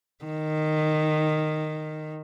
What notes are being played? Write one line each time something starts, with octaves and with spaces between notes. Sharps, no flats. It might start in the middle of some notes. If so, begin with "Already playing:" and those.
D#3